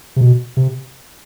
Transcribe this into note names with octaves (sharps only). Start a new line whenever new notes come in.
C3
B2
C3